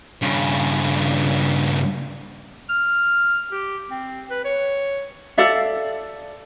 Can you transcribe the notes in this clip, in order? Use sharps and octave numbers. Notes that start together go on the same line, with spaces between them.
G2 C#3
F6
G4
C4
B4
C#5
A4 D5 E5 F5